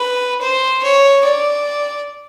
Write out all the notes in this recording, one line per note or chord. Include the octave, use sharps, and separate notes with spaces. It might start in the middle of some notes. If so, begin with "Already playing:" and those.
Already playing: B4
C5
C#5
D5